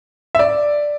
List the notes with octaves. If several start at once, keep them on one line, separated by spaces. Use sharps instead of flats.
E5
D5